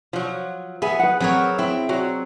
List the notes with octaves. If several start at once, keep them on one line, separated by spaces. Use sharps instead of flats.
F3 F#3
B3 G#4 E5
B4 F#5
F#3 C4 G#4 A#4 C#5
C4 E4
F#3 F#4